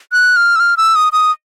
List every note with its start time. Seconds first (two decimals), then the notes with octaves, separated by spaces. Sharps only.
0.13 F#6
0.36 F6
0.56 E6
0.60 F6
0.77 E6
0.96 D#6
1.13 D#6